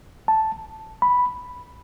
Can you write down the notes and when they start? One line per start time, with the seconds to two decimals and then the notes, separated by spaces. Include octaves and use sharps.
0.28 A5
1.02 B5